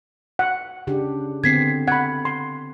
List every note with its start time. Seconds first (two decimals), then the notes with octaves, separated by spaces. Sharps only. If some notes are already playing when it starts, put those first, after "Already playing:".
0.39 F#5
0.87 C#3 D4 G4
1.44 D3 B3 C4 G#6 B6 C7
1.88 F#5 B5 G#6
2.25 C6